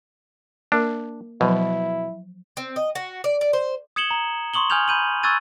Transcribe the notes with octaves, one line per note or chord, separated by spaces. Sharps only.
A#3 D4 A#4
B2 F3 F#3 E4
C4
D#5
F#4
D5
D5
C5
D#6 G#6 C#7 E7 F#7 G7
A#5
C6 C#6 D#6 F#7 G7
G#5 D#6 F6 G6 G#6 F7
B5 G6 D#7 F#7
C#6 E6 F#6 G#6 A6 D#7